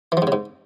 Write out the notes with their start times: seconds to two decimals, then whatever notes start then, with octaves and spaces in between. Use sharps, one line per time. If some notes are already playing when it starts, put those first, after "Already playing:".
0.12 E3
0.17 F3
0.22 G#2
0.27 C#3
0.32 G#2